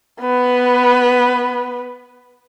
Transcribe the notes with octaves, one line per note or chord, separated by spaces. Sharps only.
B3 B4